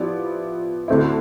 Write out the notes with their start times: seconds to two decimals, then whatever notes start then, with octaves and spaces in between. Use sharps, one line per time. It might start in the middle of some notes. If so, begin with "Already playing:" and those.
Already playing: F3 B3 E4 G4 D5
0.88 D2 D3 A3 C4 E4